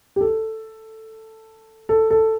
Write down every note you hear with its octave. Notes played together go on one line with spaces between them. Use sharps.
G4
A4
A4
A4